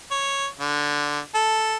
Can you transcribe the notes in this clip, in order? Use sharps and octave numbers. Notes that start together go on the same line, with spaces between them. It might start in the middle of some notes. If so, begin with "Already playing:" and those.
C#5
D3
A4